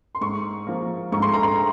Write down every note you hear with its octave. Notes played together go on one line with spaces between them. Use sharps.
C6
G#2 C#6
F3 A#3
G#2 C#6
C6
A#5
C6